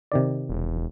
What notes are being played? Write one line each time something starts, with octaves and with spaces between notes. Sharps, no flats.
C3 D#3 D5
E1